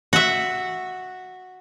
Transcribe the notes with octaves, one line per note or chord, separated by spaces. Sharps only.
F#4 E5